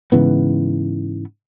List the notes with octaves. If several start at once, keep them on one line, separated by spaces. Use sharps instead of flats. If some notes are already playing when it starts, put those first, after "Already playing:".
G#2 C#3 E3 B3